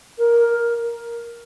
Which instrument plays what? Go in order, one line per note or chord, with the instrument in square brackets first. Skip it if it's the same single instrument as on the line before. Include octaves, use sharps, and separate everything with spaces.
[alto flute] A#4